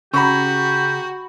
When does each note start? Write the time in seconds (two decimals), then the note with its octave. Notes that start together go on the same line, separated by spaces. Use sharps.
0.14 C#3 F#4 G4 A#5 B5 C#6